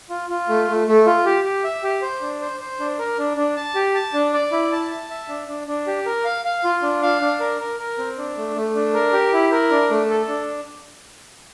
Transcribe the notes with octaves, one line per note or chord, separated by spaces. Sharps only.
F4
F4
A3
A3
A3
F4
G4
G4
E5
G4
C5
D4
C5
C5
D4
A#4
D4
D4
A5
G4
A5
D4
D5
E4
A5
A5
E5
D4
D4
D4
G4
A#4
F5
F5
F4
D4
F5
D4
A#4
A#4
A#4
C4
D4
A3
A3
D4
A#4
G4
E4
A#4
D4
A3
A4
D4